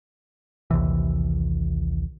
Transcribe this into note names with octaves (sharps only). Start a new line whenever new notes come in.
A#1 D#2 C3 E3